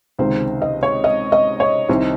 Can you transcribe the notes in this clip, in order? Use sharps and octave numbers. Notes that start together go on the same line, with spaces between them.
C#2 C3 D#3 C5
D#5
C#5
D#5
D#5
C#5
C2 C3 D#3 C5